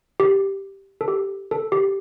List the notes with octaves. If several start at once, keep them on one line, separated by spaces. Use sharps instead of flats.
G4
A4
G4
A4
G4